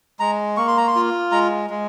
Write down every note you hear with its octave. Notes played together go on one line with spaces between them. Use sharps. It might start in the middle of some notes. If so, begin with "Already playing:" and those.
G#3 A#5
A#3 C#6
C6
A#5
C6
F4
G#3 A#5
G#3